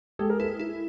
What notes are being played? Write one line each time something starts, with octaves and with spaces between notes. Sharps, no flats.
G#3 G4 A4
G#4 A#4
E4 A4 B4
E4